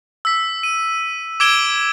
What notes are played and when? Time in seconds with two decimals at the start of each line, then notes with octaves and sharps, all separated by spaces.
0.25 E6 B6
0.63 D#7
1.40 D6 E6 G#6 D7 E7 G7